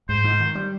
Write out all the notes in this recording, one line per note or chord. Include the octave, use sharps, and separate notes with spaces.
G#2 C5
G#2
D#3
G3